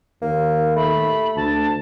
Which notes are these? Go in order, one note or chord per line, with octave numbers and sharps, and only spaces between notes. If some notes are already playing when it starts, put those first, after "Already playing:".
D#2 A#3
A3 B5
D2 A5